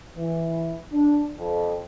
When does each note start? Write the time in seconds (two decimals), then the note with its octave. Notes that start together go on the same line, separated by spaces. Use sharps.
0.16 E3
0.91 D4
1.37 F2